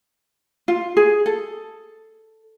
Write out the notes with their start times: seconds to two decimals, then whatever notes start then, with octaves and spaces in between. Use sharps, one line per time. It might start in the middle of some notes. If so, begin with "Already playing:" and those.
0.68 F4
0.97 G#4
1.26 A4